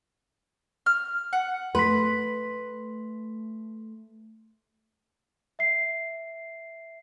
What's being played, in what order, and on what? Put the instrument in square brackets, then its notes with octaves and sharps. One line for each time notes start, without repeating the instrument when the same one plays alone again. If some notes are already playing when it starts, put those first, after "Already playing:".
[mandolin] F6
F#5
[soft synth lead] A3 [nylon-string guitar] B4 [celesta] C6 B6
[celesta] E5 C7